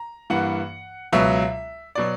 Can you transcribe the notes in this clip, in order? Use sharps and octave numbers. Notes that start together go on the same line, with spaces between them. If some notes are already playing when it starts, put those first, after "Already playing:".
Already playing: A#5
G2 E3 A#3 F#5
C#2 B2 F#3 E5
B2 F#3 D5